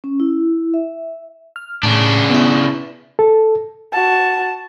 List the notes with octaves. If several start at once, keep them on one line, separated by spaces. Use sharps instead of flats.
C#4
E4
E5
F6
A2 C#3 D4
B3 E4
A4
F#4 A5